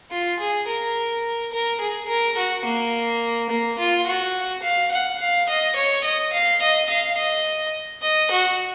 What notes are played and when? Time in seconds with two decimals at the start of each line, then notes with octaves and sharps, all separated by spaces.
0.11 F4
0.39 G#4
0.67 A#4
1.52 A#4
1.81 G#4
2.08 A#4
2.38 F#4
2.65 A#3
3.50 A#3
3.79 F4
4.06 F#4
4.63 F5
4.92 F#5
5.20 F5
5.49 D#5
5.76 C#5
6.04 D#5
6.33 F5
6.62 D#5
6.90 F5
7.18 D#5
8.02 D#5
8.31 F#4